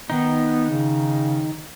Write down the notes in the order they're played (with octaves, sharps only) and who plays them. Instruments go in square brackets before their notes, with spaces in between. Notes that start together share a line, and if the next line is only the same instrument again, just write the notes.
[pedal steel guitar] D#3 D#4 [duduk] B3
[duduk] C#3